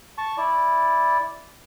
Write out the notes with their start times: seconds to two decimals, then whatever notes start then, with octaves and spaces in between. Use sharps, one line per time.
0.18 A5 C#6
0.37 E4 D5